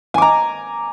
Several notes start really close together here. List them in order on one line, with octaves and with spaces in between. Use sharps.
G#5 D6 A#5